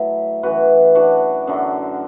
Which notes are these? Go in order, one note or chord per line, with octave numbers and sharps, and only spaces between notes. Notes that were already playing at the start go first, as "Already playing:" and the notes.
Already playing: A2 F#3 B4 E5
F#2 E3 F#4 B4
D4 F#4
F#2 D3 F#3